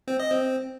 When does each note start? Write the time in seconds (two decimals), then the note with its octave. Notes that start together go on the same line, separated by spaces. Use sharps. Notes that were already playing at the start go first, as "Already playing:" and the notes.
0.08 C4
0.19 D#5
0.31 C4